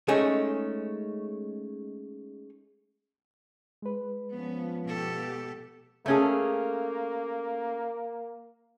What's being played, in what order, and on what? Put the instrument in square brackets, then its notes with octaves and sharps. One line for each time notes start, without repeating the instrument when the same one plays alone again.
[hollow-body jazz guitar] G#3 A3 C#4 D#4 G#4
[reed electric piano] G#3 B4
[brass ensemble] F3 [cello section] B3 C#4
[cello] B2 A4 [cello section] B3 G4
[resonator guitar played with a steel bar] A3 C#4 G#4 [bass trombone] A#3